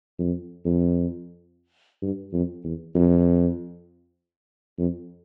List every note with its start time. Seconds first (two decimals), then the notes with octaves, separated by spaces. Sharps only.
0.19 F2
0.65 F2
2.02 G2
2.33 F2
2.64 E2
2.95 F2
4.79 F2